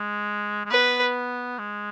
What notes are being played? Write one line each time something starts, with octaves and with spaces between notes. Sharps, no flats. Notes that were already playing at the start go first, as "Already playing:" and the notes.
Already playing: G#3
G#3
B3 B4
G#3